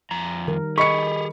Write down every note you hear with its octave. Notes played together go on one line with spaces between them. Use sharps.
F2 A#5
D#3 G3 A#4
G4 G#4 D#5 B5 C#6 B6 C#7